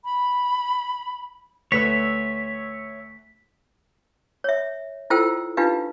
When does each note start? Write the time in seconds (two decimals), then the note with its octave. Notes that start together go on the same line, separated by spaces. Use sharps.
0.05 B5
1.72 D2 B4 C#5 E5 B6
4.44 C#5 E5
5.10 E4 F4 A4 C5 G5 E6
5.57 D4 D#4 F4 G4 B4 F5